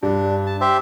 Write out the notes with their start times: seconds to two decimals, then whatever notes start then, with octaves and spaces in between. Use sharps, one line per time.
0.03 G2 D4
0.46 A5
0.61 G4 C5 E5